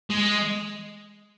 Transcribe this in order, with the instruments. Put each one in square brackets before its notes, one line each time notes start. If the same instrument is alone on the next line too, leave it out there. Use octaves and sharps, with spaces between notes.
[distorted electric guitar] G#3